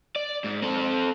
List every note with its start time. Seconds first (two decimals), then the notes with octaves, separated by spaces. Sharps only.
0.16 D5
0.44 G#2
0.62 C4 A4